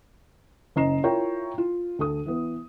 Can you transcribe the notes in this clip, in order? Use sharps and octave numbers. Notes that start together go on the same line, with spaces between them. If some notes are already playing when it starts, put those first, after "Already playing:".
F#1 C#4 D#5 A#5 C7 E7
E4 F4 A#4 C#5 G5 A#5
F4
D2 A4 D#6
E3 B3